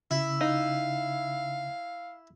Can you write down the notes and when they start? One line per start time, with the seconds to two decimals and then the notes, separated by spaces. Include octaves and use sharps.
0.11 C#3 E4
0.41 D#4 F5